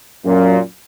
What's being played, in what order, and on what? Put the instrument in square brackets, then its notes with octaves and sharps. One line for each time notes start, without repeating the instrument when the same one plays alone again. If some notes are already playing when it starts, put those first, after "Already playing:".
[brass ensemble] F#2 A#2